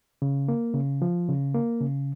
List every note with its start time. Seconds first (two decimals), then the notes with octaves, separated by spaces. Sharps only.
0.22 C#3
0.48 A#3
0.74 C#3
1.02 F3
1.28 C#3
1.55 A#3
1.81 C#3